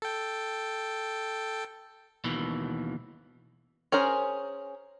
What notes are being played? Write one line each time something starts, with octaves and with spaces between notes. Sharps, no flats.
A4 G5
D#2 B2 D#3 E3
C#4 G#4 A#4 C5